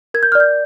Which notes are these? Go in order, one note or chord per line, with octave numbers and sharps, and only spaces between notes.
A#4 G#6
G6
D5 F6
G6